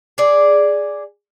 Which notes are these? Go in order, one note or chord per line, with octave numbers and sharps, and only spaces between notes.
G#4 D5